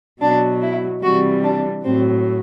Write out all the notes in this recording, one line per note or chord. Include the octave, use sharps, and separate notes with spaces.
B2 F#3 D4
E4
C3 E3 G3 F#4
D4
A2 F#3 C4